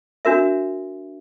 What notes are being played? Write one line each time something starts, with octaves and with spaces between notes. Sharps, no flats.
D4 F#4 A#4 E5